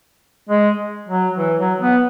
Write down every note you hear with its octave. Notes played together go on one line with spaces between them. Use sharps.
G#3
F#3
E3
F#3
B3